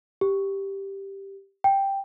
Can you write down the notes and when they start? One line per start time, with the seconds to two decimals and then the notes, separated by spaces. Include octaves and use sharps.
0.21 G4
1.64 G5